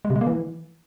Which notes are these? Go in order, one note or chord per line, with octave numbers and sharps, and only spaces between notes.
G#3
C3
G#3
A#3
E3